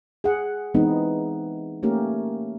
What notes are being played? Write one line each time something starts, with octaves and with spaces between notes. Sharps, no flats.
G#4 F#5
E3 G#3 B3 C4 D#4
A3 A#3 C#4 G4 A#4